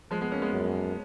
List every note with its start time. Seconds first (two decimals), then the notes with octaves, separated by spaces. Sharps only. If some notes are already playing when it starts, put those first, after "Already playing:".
0.11 F3 G#3
0.21 G#3 B3
0.32 A#3 C#4
0.42 G#3 B3
0.52 F#2